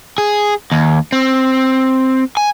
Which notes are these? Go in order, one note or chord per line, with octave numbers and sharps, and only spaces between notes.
G#4
D#2
C4
G#5